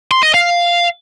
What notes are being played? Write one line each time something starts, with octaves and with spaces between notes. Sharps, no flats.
C6
D#5
F5